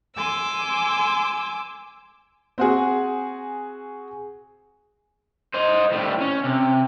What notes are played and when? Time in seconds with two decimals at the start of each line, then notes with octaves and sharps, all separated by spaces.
0.16 G#5 C6 D6 E6
2.58 C4 F#4 G#4
5.54 C5 D#5
5.92 A2 G3
6.21 C#4
6.45 C3